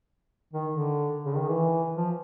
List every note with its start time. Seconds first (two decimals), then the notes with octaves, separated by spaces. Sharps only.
0.53 D#3
0.71 D3
1.25 C#3
1.36 D#3
1.48 E3
1.95 F3